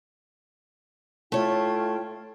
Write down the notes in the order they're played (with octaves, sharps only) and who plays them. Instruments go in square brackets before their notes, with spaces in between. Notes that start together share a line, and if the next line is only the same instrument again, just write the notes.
[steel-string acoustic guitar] A3 C#5 [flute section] E4 F4 G5